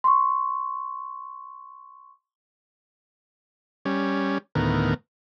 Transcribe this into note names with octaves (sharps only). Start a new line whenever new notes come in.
C6 C#6
G3 C#4
D2 A2 D#3 B3 A#4